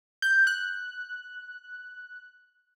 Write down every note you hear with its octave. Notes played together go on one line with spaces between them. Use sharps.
G6
F#6